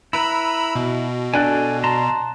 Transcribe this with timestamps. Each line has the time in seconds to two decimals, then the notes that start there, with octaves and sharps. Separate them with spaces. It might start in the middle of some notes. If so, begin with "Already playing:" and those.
0.13 E4 B4 A#5 B5 E6
0.76 B2
1.34 D4 A4 G5 G#5 F#6
1.84 A5 A#5 C6